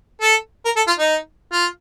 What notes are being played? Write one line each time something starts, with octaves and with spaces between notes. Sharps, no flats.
A4
A#4
A4
F4
D#4
F4